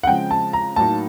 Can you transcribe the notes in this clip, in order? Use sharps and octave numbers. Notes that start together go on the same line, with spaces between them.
F#5
C#3 F3 G#3 C4 G5
A5
A#5
A2 F#3 A#3 D#4 A5